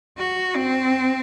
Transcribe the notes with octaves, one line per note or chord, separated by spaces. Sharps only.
F#4
C4